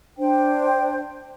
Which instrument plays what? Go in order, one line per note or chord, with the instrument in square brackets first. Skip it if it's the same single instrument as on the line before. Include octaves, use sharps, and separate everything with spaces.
[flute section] D4 C5 G5